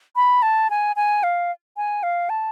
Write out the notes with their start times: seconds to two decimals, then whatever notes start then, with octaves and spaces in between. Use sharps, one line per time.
0.16 B5
0.42 A5
0.70 G#5
0.96 G#5
1.23 F5
1.77 G#5
2.03 F5
2.30 A5